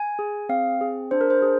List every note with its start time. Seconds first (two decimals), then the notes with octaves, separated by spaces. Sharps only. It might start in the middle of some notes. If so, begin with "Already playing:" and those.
Already playing: G#5
0.19 G#4
0.49 C4 F5
0.81 G#4
1.11 D4 C5
1.21 A#4
1.30 C5
1.42 G#4